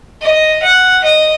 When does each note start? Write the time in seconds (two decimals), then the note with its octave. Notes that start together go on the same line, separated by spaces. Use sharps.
0.21 D#5
0.62 F#5
1.04 D#5